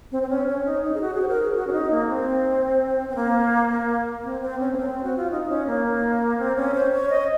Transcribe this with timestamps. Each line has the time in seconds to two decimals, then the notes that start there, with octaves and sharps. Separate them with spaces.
0.12 C4
0.22 C4
0.29 C#4
0.48 C#4
0.66 D#4
0.84 D#4
0.94 G#4
1.01 F#4
1.14 G#4
1.21 C5
1.28 A#4
1.42 G#4
1.55 F#4
1.67 C#4
1.72 D#4
1.91 A#3
2.08 C4
3.09 C4
3.16 A#3
4.24 C4
4.42 C4
4.59 C#4
4.73 A#3
4.77 C4
5.03 F#4
5.17 F4
5.31 D#4
5.49 C#4
5.67 A#3
6.38 C4
6.56 C#4
6.74 C5
6.92 C#5
7.10 D#5